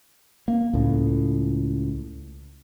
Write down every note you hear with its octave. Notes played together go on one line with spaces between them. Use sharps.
A#3
C#2 A2